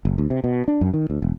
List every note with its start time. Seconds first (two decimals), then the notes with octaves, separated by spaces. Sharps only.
0.05 F#1
0.18 D2
0.30 C3
0.44 B2
0.68 D4
0.81 F#2
0.94 D#3
1.10 D2
1.22 E1